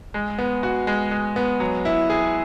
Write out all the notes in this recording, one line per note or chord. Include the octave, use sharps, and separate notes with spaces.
G#3
B3
F#4
G#3
G#3
B3
F#3
E4
G#4